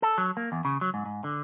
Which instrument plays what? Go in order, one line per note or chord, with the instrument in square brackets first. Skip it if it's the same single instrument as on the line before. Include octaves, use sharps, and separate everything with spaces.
[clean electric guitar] A4
F#3
A#3
E2
C#3
F#3
G#2
G#2
D3